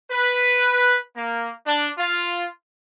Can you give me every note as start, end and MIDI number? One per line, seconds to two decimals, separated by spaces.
0.11 0.98 71
1.15 1.51 58
1.67 1.89 62
1.98 2.47 65